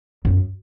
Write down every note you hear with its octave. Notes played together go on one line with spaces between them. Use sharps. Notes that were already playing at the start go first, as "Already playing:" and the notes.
F#2